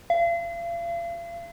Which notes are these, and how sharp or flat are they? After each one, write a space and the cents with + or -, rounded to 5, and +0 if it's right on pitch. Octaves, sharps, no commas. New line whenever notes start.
F5 -40